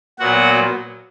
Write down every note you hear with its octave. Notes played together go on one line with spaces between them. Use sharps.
A#2 F#3 B3 F#4 F#5